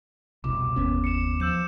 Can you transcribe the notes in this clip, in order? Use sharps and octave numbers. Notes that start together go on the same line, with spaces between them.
F1 C2 B2 D6
F#1 D#2 B3 C#4
C#7 E7
F3 E6 G6 E7